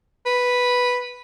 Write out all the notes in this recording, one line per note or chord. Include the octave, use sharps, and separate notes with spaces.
B4